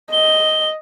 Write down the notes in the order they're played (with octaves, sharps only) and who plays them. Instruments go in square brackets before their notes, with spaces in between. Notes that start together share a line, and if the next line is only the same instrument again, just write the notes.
[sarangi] D#5 [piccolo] G7